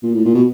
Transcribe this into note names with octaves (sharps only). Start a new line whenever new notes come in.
A#2
A2
A#2
B2